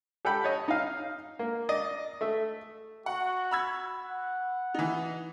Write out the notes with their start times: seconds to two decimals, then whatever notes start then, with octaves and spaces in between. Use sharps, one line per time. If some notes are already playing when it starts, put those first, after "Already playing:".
0.25 G4 A4 F#5 G5 B5
0.44 C#5 D#5
0.68 D#4 F5
1.39 A#3
1.69 D5 D#5
2.21 A3 E5
3.06 F#4 F#5
3.51 B5 E6 G#6
3.93 F#5
4.74 E3 D#4